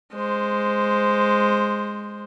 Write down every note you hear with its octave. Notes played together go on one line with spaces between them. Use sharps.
G#3 C5